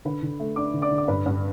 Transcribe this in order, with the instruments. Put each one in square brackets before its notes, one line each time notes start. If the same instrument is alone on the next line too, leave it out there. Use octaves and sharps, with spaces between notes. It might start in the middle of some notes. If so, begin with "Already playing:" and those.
[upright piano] D3 B4 B5
D3
A3
D4 D5 D6
D3
D5 D6
D3
D6
G2 B4 B5
G2